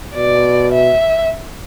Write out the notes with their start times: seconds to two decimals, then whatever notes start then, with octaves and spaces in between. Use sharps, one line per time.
0.15 B2 D5
0.72 E5